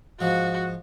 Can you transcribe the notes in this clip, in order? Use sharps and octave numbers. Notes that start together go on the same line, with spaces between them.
G#2 F3 F#4